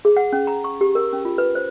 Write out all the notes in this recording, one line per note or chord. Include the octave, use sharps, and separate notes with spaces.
G#4
F#5
C#4
A#5
C#6
G4
A#4
C#4
F4
B4
C5